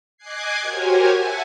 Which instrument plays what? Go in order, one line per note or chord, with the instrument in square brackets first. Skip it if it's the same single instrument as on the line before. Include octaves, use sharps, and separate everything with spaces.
[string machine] D#5 G#5 D6 F#6 G#6 C7
F#4 G4 A#4 C5 C#5 G#5
E5 F#5 G#5 A5